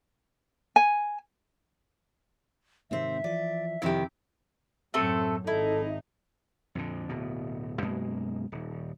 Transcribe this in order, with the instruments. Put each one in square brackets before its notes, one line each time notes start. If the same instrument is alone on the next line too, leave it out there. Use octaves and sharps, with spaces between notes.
[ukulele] G#5
[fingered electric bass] G#2 C3 D#3 [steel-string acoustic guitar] C4 G4 [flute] E5
[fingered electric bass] E3 F3 [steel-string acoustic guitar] D5
[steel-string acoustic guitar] F2 C3 D#3 [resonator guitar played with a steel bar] E4 G4
[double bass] F#2 A2 [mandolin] A3 C4 A4
[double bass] G#1 D#4 [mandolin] E4 [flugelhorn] A4
[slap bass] F2 A#2 D3
D1 B2
F#2 B2 G#3 A#3
D#1